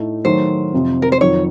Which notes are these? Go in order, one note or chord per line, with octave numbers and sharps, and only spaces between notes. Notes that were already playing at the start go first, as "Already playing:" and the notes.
Already playing: A2 A3 D#4
D#3 F#3 A3 C5
F2 C3 F3 C4
A#4
C5
F2 D#3 F#3 C#5